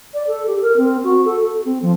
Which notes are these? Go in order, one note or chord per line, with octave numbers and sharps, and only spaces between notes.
D5
A4
G4
A#4
C4
F#4
A4
A4
C4
F3